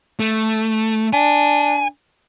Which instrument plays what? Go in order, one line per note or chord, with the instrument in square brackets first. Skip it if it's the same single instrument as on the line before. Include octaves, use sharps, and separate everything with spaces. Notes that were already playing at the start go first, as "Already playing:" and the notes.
[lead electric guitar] A3
[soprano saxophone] D4 [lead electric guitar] G#5